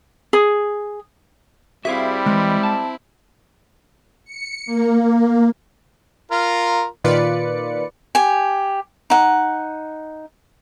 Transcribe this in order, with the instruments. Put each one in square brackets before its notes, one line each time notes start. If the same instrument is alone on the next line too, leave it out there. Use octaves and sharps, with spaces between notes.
[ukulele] G#4
[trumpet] G3 [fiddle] C4 E4 [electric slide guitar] F#4 G#4 F5 [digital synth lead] E5
[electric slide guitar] D#3 E3 [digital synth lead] G#3
[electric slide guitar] A5
[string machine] C#7
A#3
[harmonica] F4 A#4
[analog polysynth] A#2 D#3 F4 B4 D5 C#7
[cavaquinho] G4 G#5
D#4 F#5